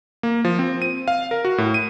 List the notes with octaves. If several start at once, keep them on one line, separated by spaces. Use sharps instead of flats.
A#3
F3
C4
D#7
F5
A#4
F#4
A2
D#7